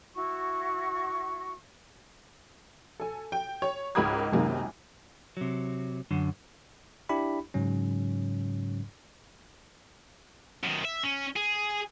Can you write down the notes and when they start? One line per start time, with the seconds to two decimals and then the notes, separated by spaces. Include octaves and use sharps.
0.15 E4 F#4 C#6
3.00 A4 G#5
3.32 G5
3.62 C#5
3.95 C#2 G#2 A#4 B5 D#6 G#6
4.32 C#2 F#2 C3 D#3 G#3 A#3
5.37 C3 F#3
6.11 F#2 D3
7.09 D4 E4 G4 B5
7.54 G#2 C#3 F#3 C#4
10.63 F#2 D#3
10.85 E5
11.03 C#4
11.36 G#4